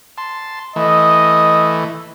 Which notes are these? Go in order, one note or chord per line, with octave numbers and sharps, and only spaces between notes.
A5 C6
E3 A3 D#5